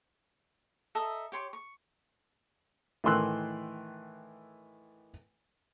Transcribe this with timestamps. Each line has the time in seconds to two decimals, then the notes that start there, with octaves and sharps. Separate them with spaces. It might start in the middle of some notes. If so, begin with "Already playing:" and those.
0.95 A4 D#5 E5 A#5
1.32 G4 C#5 C6 D6
1.53 C#6
3.04 A2 D#3 E3 C6 E6 F#6